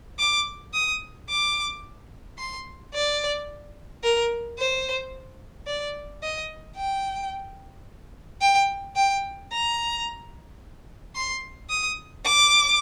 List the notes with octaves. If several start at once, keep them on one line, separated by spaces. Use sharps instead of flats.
D6
D#6
D6
C6
D5
A#4
C5
D5
D#5
G5
G5
G5
A#5
C6
D#6
D6